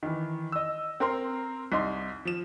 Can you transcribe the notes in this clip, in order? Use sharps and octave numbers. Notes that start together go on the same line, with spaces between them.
D#3 E3
D#5 E6
C4 A#4 C6
C2 D#4 C6
F3 E7